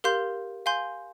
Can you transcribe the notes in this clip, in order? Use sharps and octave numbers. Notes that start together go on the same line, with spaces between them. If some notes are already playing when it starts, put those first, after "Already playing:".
G4 A#4 F5 C6 G6
F5 G#5 C6 G6